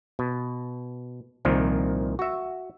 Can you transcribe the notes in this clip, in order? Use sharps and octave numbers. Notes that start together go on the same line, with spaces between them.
B2
C2 A#2 D#3 F3
F#4 E5